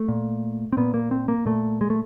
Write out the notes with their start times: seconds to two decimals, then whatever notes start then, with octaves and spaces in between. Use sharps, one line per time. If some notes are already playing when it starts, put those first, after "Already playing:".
Already playing: A3
0.08 A#2
0.73 C4
0.77 A#2 B3
0.94 A#3
1.11 C4
1.28 A#3
1.46 A#2 A3
1.81 G#3
1.90 A3